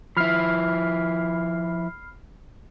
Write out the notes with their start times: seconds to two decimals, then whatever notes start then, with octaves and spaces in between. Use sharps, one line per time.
0.17 F3 E4 B5 F6 C7